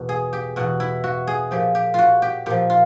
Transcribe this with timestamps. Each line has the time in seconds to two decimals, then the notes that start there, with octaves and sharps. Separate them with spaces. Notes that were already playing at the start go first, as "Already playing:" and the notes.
Already playing: E2 B2
0.09 G#4
0.33 G4
0.56 E2 B2 F#4
0.80 E4
1.04 F#4
1.27 G#4
1.51 A#2 F3 G4
1.75 G4
1.94 F4 F#4
2.22 G4
2.46 A#2 F3 G4
2.70 F4